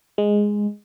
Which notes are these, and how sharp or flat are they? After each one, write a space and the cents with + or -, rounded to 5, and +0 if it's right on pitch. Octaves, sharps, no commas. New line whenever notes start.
G#3 -5